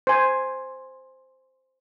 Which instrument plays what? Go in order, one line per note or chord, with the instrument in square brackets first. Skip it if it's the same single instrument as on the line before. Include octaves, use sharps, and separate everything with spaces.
[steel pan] C5 G#5